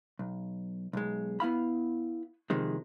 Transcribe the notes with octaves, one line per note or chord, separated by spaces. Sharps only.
B1
B1 G#3
B3 E4 F5 B5
C3 D#3 F3 G#3